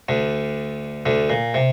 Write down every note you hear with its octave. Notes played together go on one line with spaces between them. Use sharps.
D2 D3
D2 D3
A#2
C3